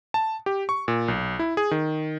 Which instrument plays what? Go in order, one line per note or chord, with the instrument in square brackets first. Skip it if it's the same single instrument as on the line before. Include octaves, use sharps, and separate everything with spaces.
[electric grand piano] A5
G4
C#6
A#2
B1
E4
G#4
D#3